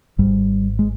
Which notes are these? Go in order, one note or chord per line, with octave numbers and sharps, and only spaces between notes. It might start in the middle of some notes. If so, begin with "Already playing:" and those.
G#1 G#2 G3
G#3